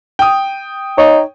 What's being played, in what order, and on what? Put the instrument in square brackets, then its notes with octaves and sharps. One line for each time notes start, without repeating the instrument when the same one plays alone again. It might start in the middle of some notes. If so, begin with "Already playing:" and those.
[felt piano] G5 D#6
[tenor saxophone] D#4 [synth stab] C#5